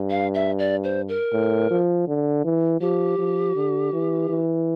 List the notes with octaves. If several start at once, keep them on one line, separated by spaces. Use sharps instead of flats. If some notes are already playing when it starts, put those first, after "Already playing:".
Already playing: G2
F5
E5
D5
C5
A#4
A2
F3
D3
E3
F3 G4
F3
D3
E3
E3